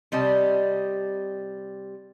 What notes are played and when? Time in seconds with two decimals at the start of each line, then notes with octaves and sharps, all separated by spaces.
0.12 C3 G3 D#5 A5